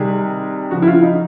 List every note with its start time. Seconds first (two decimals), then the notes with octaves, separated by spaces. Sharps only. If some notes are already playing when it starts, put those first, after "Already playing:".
Already playing: C3 D#3 G3 G#4
0.71 C#3 F3 F#4
0.82 E4
0.87 F4
1.03 D#4